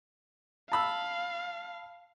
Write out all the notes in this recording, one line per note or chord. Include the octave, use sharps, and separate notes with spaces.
F5 A5 B5 E6